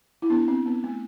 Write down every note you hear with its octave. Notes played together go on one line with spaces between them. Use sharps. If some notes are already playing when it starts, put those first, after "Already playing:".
E4
B3 D4
C4
B3
A3